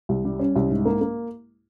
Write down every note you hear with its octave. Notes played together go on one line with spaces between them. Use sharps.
C2
G3
C#4
C2
G#2
A#3
A#3